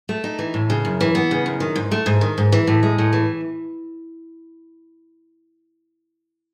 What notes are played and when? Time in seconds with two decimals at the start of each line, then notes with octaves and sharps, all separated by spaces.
0.09 A3
0.24 D#4
0.39 E3
0.54 A2
0.70 C#3
0.85 F#2
1.01 E3
1.15 B3
1.31 C#3
1.46 F#2
1.60 D#3
1.76 G#2
1.92 A3
2.06 G#2
2.21 D#3
2.38 G#2
2.52 E3
2.67 A2
2.83 G#3
2.98 A2
3.13 E3